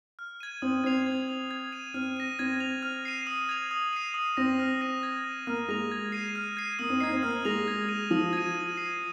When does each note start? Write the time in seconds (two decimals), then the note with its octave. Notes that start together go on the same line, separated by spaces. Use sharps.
0.19 F6
0.40 G#6 D#7
0.62 C4 D#6
0.84 C4 G#6 C7 F7
1.06 G#6
1.29 F7
1.51 G#6
1.72 D#7
1.94 C4 F6
2.17 A#6 D#7
2.39 C4 G#6
2.60 F7
2.83 F6
3.05 C7 D#7
3.27 D#6
3.49 G#6 F7
3.71 D#6
3.93 C7 D#7
4.14 D#6
4.37 C4 A#6 F7
4.59 F6
4.81 A#6 D#7
5.03 G#6
5.24 D#7
5.47 A#3 F6
5.68 G#3 A#6 F7
5.92 G#6
6.12 C7 D#7
6.36 F6
6.57 G#6 C7 D#7
6.79 A#3 D#6
6.90 C4
7.00 D#4 C7
7.03 G#6
7.12 C4
7.22 A#3 F6
7.45 G#3 A#6 F7
7.68 G#6
7.89 D#7
8.11 F3 D#6
8.33 G#6 D#7
8.55 G#6
8.77 C7 D#7